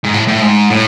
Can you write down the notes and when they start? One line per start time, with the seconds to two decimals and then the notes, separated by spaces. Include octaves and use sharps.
0.05 G#2
0.14 A2
0.28 A2
0.42 G#2
0.70 A2